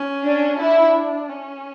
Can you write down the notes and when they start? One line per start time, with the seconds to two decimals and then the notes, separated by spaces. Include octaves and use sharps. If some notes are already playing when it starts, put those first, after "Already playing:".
Already playing: C#4
0.25 D4
0.59 D4 E4
1.29 C#4